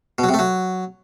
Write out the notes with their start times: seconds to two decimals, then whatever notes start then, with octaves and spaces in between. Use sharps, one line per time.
0.18 B2
0.24 F#3
0.29 C3
0.34 A3
0.39 F#3